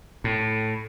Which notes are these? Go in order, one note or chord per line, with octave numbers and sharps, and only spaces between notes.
A2